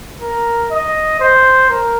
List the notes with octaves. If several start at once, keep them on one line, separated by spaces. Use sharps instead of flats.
A#4
D#5
C5
A#4